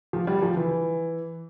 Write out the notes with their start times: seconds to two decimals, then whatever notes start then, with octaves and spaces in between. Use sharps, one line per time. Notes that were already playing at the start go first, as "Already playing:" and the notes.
0.13 F3
0.27 G3
0.42 F3
0.56 E3